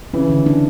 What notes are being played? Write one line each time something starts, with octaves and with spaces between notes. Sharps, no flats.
C#3 E3 C#4
D3
D4